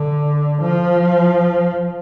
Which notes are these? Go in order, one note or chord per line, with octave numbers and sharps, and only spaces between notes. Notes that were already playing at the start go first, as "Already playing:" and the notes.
Already playing: D3
F3